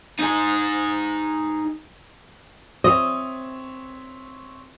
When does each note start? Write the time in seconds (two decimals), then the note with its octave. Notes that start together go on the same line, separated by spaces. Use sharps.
0.19 D#4 G#4
2.84 C4 C#5 D#5 E5